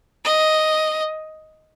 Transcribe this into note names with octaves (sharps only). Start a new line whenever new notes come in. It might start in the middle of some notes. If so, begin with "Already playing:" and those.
D#5